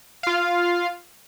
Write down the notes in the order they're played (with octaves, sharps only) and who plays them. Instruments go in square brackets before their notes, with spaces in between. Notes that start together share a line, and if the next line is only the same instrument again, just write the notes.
[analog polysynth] F4 F5